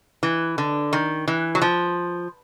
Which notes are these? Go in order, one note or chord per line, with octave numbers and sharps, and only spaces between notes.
E3
D3
D#3
E3
F#3
F3